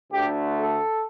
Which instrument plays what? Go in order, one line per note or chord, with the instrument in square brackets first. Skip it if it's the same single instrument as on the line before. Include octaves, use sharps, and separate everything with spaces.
[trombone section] D2 D3 A3 G4
A4